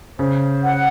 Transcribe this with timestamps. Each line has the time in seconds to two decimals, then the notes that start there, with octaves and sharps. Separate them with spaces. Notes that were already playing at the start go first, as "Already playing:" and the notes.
0.18 C#3 C5
0.64 F#5